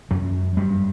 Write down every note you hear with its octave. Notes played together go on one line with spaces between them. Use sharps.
F#2 F#3
G2 G3